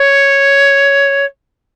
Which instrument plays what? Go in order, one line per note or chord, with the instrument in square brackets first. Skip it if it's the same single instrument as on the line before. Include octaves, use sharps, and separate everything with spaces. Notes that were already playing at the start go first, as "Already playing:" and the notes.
Already playing: [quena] C#5